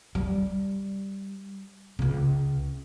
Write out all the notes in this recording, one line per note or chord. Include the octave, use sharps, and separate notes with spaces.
G3
C#2 C#3